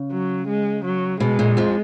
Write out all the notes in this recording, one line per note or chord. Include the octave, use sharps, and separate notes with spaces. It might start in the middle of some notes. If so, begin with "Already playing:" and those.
Already playing: C#3
F#3
G#3
F#3
B2 G#3
A#2
F2 F3